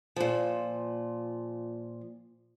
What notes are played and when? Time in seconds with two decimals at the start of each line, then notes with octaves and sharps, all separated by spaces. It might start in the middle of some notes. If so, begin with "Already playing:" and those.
0.16 A#2 F3